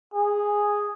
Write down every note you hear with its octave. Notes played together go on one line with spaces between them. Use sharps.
G#4